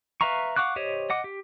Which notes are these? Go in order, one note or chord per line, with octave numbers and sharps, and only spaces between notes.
B4 E5 F5 A#5 C#6
F5 F#5 C#6 D6 F#6
G4 C5 C#5 D#5
D#5 F#5 D6
G4